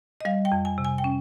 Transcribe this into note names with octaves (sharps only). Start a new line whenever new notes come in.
D#5
G3 F5
G5
F2
G#5
C3
G#5
G5
C#4